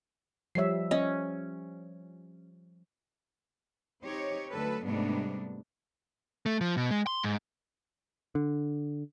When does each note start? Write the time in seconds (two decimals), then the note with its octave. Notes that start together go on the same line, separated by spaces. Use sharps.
0.55 F3 G3 C#5 E5 C7
0.91 C#4 D#5
4.03 C4 D#4 G4 C#5
4.50 D2 F#3 A4 B4
4.84 G#2 C3 G3 A3 B3 D4
6.46 A3
6.61 F3
6.77 B2
6.91 G#3
7.07 C6
7.24 G#2
8.35 D3